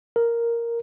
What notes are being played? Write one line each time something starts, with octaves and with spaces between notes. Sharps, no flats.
A#4